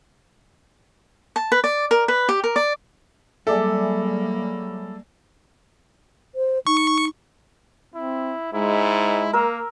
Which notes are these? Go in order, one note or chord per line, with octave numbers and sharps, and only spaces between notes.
A5
B4
D5
A#4
B4
G4
A#4
D5
F#3 G3 A#3 G#4 A4 D5 E5
C5
D#4 C#6
C4 E4
G#2 G#3 E4
A#3 A#4 E6